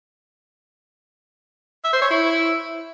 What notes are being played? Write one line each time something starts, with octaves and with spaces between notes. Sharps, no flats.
E5
C5
C#5
E4